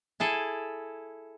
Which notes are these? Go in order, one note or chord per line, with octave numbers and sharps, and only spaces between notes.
E4 G#4 A4